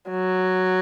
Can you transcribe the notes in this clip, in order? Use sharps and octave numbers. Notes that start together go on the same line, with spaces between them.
F#3